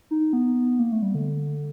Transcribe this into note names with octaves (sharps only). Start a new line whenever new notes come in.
D#4
B3
A#3
A3
G3
D3